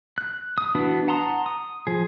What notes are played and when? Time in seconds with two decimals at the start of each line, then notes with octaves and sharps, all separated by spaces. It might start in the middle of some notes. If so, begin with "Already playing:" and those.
0.18 F#6
0.58 D#6
0.75 E3 B3 D4 F#4 B4
1.08 F#5 A5 A#5 C6 D#6
1.46 D#6
1.87 F3 G#4